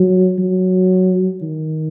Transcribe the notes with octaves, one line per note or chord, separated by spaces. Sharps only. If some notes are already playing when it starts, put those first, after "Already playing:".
Already playing: F#3
F#3
D#3